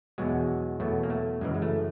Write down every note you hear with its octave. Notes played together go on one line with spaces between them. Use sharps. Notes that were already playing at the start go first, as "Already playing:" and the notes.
E2 B2 F#3 G#3
E2 B2 F#3 A3
A#3
A3
F#2 C#3 E3 G#3
G#3
A3